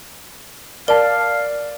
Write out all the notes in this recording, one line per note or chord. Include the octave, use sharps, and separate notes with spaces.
A#4 D5 F5 A5